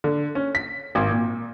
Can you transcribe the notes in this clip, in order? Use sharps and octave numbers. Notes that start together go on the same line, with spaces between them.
D3
C#4
B6
G#1
A#2